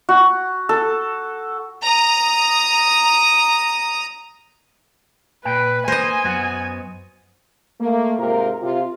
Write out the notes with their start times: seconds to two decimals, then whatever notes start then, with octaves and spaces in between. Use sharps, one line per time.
0.09 F#4
0.69 A4
1.83 A#5 D#6
5.45 A#2 B4 G5
5.88 A#3 D#4 C5 D#5 G#5
6.24 F#2 B3 F#4
7.81 A3 A#3
8.19 G#2 C3 F4 A#4
8.63 C3 F4